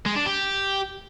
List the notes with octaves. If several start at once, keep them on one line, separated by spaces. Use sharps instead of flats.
G#3
D4
G4